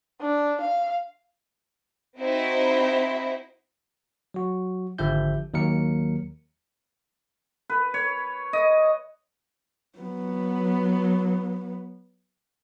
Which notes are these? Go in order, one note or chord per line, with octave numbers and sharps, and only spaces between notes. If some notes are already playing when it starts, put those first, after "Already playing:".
D4
F5
C4 D#4 E4 F#4 C5 E5
F#3 F#4
G#1 D3 F3 G4 E5 G6
D#2 F#3 A#3 A#4 C#7
B4
C#5
D#5
F#3 B3